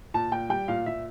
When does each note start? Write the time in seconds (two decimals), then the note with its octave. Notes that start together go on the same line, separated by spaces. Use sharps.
0.14 A#2 A5
0.31 A#2 G5
0.49 G3 G5
0.68 A#2 F5
0.86 A#2 E5